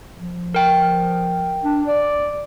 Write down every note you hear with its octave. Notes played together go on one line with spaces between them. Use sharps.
F3
A#4 G5
D4
D5